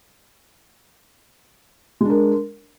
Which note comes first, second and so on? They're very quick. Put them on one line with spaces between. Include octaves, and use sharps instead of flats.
G#3 D4 A#4